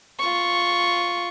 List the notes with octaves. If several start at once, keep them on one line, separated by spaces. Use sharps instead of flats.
F4 C#6